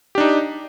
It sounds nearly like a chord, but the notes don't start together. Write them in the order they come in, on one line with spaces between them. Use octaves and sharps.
G4 D4 D#4